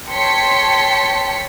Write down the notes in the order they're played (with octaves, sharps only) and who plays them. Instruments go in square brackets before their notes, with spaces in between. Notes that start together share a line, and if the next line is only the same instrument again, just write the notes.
[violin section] C#5 G5 A5 C6 B6 C#7